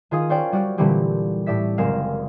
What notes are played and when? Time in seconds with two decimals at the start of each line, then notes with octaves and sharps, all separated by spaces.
0.11 D#3 F4 G#4 F5 D#6
0.29 C#4 C5 D5 G5
0.52 G3 F#4 D5 F6
0.78 A#2 D3 E3 G3 C4 G4
1.46 A2 G4 D5 E5 B6
1.78 F#1 G#3 C4 A#4 F5 E7